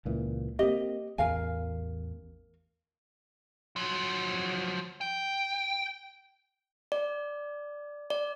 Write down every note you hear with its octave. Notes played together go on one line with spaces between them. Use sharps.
C#2 A#2 E3
A#3 C4 G4 D#5
A1 E2 A#4 F5 G#5
F3 F#3
G5
D5
D5